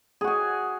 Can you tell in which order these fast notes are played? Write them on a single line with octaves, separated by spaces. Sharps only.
G#4 F#4 G#5